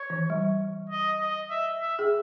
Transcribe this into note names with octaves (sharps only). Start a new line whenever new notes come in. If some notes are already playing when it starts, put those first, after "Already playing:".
Already playing: C#5
E3
G3
D#5
D#5
E5
E5
G#4